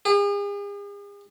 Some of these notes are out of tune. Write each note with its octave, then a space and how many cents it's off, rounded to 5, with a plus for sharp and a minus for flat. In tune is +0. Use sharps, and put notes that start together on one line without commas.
G#4 -45